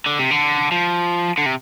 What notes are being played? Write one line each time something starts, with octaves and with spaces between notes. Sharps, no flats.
D3
C3
D3
F3
D3
C3